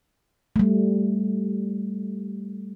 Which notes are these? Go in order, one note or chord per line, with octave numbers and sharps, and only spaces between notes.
G3 A3